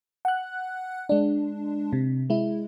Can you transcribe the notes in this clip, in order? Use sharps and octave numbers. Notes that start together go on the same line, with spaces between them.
F#5 F#6
G#3 D4
C3
G#3 E4